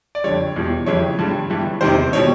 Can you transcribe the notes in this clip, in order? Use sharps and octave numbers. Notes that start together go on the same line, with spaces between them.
D5
F2 D3 G3 C#5
E2 B2 G3
F2 C#3 E3 G3 C#5
G2 D3 G3
G2 E3 G3
E2 C3 D#3 G3 C5
B2 G3 C#5